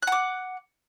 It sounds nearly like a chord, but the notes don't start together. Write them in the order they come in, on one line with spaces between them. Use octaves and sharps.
F#6 F#5 D6